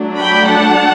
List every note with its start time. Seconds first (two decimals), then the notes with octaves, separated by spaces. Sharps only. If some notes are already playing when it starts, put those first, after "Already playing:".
Already playing: F#3 A3 D4
0.19 G5 B5
0.47 F#5 A5